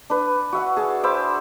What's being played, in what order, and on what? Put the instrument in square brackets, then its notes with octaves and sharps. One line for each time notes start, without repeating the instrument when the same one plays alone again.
[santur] D4 B4
F#4 E5 F#5
G#4 A5
C5 E5 B5 D6